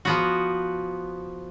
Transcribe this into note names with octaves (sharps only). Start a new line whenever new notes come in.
F3 B3 F#4